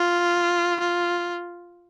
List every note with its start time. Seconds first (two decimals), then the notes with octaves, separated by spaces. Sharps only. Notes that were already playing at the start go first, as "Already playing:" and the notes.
Already playing: F4
0.80 F4